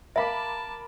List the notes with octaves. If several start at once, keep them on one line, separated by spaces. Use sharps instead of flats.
A#4 E5 F5 A5 B5 D6